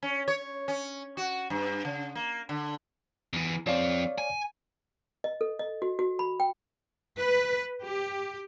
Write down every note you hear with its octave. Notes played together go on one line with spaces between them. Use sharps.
C#4
C#5
C#4
F#4
G2
C#3
A#3
D3
E2 E3
F3 C4 C#5 D5 F5
G#5
D#5
A4
D#5
F#4
F#4
B5
G5
B4
G4